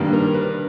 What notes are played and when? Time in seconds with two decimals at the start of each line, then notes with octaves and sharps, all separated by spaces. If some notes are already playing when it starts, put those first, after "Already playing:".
Already playing: G2 D#3 G3 A#3
0.13 A#4
0.34 B4